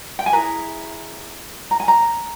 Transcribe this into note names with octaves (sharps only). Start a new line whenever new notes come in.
G5
G#5
E4 G#4 B4 A#5
A#5
G#5
A#5